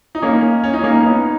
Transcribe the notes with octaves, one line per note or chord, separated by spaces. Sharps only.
D#4
A#3 C#4
C#4
D#4
A#3 C#4
B3 D#4